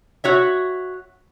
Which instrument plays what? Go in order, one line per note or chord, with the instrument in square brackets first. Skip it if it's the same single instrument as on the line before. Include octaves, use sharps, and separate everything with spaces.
[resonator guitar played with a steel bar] F#4 C#5 E5